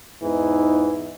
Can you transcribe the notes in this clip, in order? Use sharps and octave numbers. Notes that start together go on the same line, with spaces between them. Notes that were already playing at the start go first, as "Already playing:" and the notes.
E2 G#2 E3 D#4